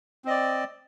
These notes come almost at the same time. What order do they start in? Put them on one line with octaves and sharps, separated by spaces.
C4 D#5 D5